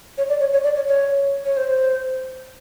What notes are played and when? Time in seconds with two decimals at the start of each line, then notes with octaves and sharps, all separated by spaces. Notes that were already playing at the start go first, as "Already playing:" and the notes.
0.18 C#5
0.29 D5
0.41 C#5
0.53 C#5
0.64 D5
0.76 C#5
0.87 C#5
1.45 C#5
1.57 C5